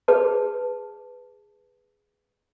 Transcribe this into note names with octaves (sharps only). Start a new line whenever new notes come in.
G#4 B4 A5